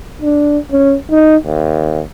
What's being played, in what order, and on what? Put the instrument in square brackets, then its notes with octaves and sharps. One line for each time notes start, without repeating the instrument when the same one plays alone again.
[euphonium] D4
C#4
D#4
D#2